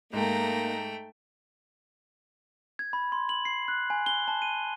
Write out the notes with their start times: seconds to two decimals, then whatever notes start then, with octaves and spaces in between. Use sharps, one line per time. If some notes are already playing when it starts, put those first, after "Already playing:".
0.13 G#2 A3 A#3 D#4 G5 A#5
2.79 G#6
2.93 B5
3.12 C6
3.29 F#7
3.45 C7
3.68 F#6
3.90 G#5
4.06 G7
4.28 A5
4.42 D#7